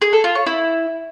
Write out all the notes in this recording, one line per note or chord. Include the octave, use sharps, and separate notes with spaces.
G#4
A4
F4
C#5
E4